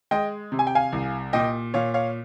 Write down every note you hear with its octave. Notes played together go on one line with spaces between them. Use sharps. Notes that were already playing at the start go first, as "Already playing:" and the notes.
G#3 D#5 G5
C3
G#5
G5
F5 G#5
C2
A#2 D#5 G5
A#2 C#5 F5
C#5 F5